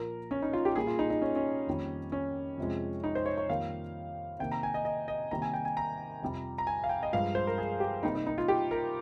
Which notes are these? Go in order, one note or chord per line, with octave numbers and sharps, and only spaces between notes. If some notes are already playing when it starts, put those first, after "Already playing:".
Already playing: A#2 F3 A#3 A#4
C#4
D#4
F4
G4
A#2 G3 A#3 G#4
F4
D#4
D#4
C#4
C#4
F2 D#3 G3 A#3
C#4
F2 C3 F3 G#3
D#4
C5
C#5
C#5
F2 D#3 G3 A#3 F5
C3 D#3 A#3 G5
A#5
G#5
D#5
D#5
D#5
C3 D#3 G3 A#3 A#5
G#5
G5
G#5
A#5
F2 C3 G3
A#5
G#5
F5
G5
D#5
G2 F3 G#3 F5
C5
A#4
G#4
G4
C3 G3 A#3 D#4
D#4
D#4
F4
G4
A#4